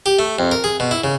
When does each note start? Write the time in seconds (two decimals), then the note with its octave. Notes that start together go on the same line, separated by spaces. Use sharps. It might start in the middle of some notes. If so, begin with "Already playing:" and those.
0.06 G4
0.19 A3
0.39 F2
0.51 A#4
0.64 G#4
0.80 B2
0.91 E4
1.04 C#3